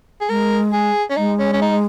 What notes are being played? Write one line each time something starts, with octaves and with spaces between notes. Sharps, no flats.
G#4
G#3 A#4
G#4
C#4
G#3 D#4
C#4
C#4
D#4